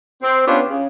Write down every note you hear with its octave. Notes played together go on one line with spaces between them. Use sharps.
C4
B3 C#4 D4 F4 G4
C#3